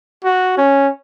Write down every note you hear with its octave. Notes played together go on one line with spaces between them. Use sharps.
F#4
C#4